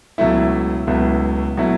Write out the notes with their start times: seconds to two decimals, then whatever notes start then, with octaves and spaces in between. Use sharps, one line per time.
0.18 C#2 B2 F#3 A3 E4 E5
0.87 C#2 B2 F#3 A3 E4
1.57 B2 F#3 A3 E4